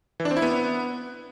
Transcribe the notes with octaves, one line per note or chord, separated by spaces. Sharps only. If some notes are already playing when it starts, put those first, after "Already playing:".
E3
D4
C4
E4
B3